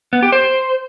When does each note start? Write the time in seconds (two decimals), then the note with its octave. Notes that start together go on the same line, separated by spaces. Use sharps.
0.13 B3
0.23 G4
0.32 C5